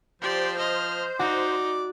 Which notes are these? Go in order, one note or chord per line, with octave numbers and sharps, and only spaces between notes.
F3 G4 C5 D5
D#5 F6
D#4 F#4 D5